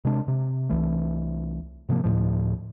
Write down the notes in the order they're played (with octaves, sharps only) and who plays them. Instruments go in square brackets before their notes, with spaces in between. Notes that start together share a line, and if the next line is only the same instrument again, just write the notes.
[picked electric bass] C3 G#3 D4
C3
C2 E3 A3
G#2 C3 F3 A#3
D2 A2 F3